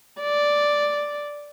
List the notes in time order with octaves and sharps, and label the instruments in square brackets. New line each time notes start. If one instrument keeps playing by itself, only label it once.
[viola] D5